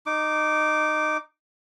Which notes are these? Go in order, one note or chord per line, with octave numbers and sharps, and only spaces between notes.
D#4 D6